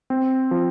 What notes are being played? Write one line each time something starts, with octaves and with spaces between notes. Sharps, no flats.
C4
F3